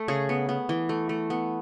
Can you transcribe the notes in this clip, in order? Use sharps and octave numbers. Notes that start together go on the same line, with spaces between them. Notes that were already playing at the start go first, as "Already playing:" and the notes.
Already playing: A3
C#3 G#4
B3
B3
E3
A3
A3
B3